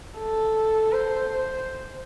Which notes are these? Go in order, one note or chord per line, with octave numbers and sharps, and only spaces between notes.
A4
C5